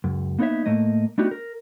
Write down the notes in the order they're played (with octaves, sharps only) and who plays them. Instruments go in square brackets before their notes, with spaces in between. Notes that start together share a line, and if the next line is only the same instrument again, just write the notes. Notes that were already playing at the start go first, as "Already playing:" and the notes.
[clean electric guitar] C#2 F#2
A#3 B3 D#4 C5 C#5 E5
A2 A3 A#3 D#5
A3 B3 D4 D#4 F#4 G4
A#4